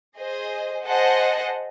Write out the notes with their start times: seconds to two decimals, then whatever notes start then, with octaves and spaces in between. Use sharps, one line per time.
0.18 G#4 C5 D#5
0.86 G#4 C5 D#5 F#5 A5